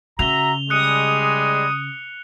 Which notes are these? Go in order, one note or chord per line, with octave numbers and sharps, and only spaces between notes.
C#3 F#4 E5 A#5 F7 G7
G3 G#3 D#6 F#6 C#7